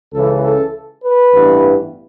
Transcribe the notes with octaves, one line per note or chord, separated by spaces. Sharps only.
C#2 C#3 E3 A4
A4
B4
A1 G2 E3 G3 B3